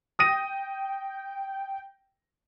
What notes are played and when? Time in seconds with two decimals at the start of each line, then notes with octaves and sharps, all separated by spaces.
0.19 G5 D#6 A#6 D#7